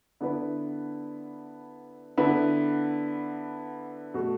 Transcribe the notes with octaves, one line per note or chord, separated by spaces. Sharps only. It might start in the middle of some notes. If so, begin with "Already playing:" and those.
D3 B3 E4 B4
D3 B3 E4 B4
B2 A3 F#4